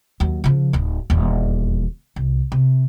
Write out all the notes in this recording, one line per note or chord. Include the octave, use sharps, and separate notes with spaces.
D#2 F#3
C#3 F3
D1 D#4
D#1 E2
C2
C3